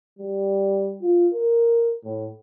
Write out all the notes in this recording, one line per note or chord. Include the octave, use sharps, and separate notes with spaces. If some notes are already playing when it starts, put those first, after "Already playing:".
G3
F4
A#4
A2